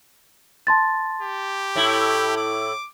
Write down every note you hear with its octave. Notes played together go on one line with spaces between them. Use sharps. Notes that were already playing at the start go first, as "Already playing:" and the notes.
A5 C6 A6
G4
A2 E4
D6